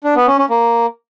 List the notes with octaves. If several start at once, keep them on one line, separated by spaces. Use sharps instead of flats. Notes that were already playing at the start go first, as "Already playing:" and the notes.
D4
B3
C#4
C#4
A#3